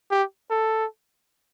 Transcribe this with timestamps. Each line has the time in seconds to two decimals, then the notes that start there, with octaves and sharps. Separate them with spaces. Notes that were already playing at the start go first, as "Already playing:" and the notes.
0.11 G4
0.50 A4